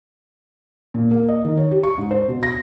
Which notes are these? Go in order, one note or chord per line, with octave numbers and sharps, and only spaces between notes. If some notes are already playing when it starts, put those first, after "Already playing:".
A#2
A#3
D#5
D#3
C#5
G4
C#6
G#2
C5
B2
A#6